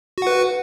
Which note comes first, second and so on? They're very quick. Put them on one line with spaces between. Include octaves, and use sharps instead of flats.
F#4 F#5 B4